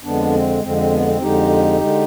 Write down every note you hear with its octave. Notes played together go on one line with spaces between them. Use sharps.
F2 D3 G#3 B3 D4
C4
F2 D3 G#3 C4
C4
B3
C4
F2 D3 G#3 D#4 G4
D3 G#3